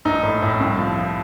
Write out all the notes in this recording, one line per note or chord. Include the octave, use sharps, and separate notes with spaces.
A#1 D#4
A2
A2
C2
F3
F3